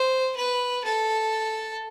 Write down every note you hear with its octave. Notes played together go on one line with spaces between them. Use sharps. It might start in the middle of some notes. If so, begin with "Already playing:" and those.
Already playing: C5
B4
A4